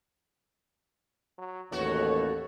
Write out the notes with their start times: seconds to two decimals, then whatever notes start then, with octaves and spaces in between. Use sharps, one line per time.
1.38 F#3
1.72 A1 D#2 A3 F#4 C#5